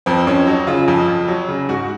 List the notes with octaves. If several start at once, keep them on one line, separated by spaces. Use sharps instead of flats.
F2 C4
F2 C#4
F#3 D#4
C#3 F4
F2
F2
F#3
C#3
G#2 F#4